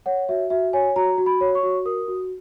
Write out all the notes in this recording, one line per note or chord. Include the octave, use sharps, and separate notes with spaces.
C#5 F#5
F#4 E5
F#4 E5
C#5 G#5
F#4 A#5
F#4
B5
C#5
C#6
F#4
A#4 D#6
F#4